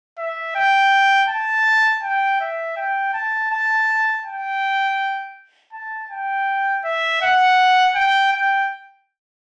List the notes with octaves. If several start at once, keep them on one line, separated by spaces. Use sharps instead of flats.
E5
G5
A5
G5
E5
G5
A5
A5
G5
A5
G5
E5
F#5
G5
G5